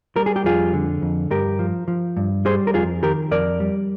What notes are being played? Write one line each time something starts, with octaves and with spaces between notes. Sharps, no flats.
G3 A#4
G#4
G4
F2 F4 G#4
D3
F2
G2 G4 A#4
F3
F3
G2
G3 G#4 C5
A#4
F2 F4 G#4
D#3 G4 A#4
F2 A#4 D5
G3